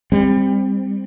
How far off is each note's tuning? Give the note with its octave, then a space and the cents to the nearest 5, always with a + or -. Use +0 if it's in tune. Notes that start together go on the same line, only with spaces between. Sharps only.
G3 +25 C4 +0